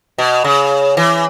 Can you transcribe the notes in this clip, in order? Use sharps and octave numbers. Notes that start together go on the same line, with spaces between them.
B2
C#3
E3